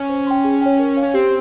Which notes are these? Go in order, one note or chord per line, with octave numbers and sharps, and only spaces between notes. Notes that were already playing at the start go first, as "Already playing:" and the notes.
Already playing: C#4
C5
G5 C6
G#4
C#5 G5
A#4
C#5 F5
C#4
C4 G4